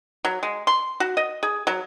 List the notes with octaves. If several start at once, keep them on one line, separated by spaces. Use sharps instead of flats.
F#3
G#3
C6
F#4
D#5
G#4
F#3